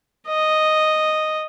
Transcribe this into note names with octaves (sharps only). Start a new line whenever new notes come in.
D#5